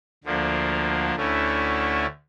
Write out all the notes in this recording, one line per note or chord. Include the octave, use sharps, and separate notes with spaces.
D2 D3 F3 A#3 D4
D2 D3 A3 C#4 E4